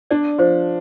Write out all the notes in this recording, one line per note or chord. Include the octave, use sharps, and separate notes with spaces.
D4 D5
F3 C5